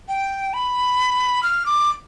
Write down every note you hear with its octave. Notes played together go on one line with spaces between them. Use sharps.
G5
B5
F6
D6